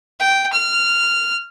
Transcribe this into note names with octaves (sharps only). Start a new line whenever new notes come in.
G5
F6